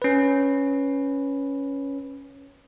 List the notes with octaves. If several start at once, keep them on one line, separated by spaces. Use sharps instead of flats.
C#4 B4